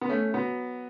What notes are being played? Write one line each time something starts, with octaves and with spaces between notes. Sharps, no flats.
B3
A3 C#4
F#3 B3